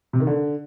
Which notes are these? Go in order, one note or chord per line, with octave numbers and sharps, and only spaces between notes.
C3
D#3
D3